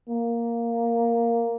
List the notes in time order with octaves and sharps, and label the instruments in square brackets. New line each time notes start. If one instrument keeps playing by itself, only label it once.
[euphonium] A#3